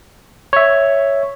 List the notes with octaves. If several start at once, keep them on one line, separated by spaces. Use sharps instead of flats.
C#5 E5